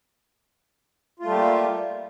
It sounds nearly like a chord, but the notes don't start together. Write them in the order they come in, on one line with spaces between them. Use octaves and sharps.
F4 A3 G3 G4 A#3